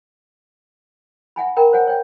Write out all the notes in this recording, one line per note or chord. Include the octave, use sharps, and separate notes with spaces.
E5 F#5 G#5 B5
A#4 G5 A#5 B5
C5 C#5 F#5 G#5
C#5 G5